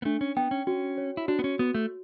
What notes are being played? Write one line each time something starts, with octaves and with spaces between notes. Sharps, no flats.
B3
A3 D4
C#4
B3 G5
C#4
C#4 F#4
C#5
E4
D4 F#4
B3
C#4
B3 F#4
A3